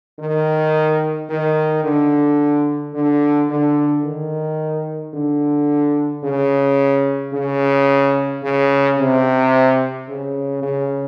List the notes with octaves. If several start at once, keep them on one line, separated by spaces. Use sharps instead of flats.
D#3
D#3
D3
D3
D3
D#3
D3
C#3
C#3
C#3
C3
C#3
C#3